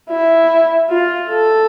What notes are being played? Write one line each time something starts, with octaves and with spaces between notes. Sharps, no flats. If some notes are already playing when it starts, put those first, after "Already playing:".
E4
F4
A4